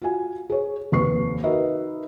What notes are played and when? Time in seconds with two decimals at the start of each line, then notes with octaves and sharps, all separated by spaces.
0.02 F4 F#4 G#5
0.50 G#4 C#5
0.92 F1 D#2 B4 C#6 C7
1.43 D#4 F#4 A#4 B4 D#5 E5